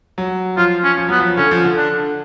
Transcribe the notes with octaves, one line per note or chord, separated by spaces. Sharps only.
F#3
F3 F4
C#4
F3
F#3 B3
F3
D3 C#4
F3
D3
D4